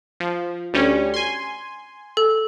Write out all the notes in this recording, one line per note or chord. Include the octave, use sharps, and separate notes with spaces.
F3
D2 G3 C#4
G#5 C6
A4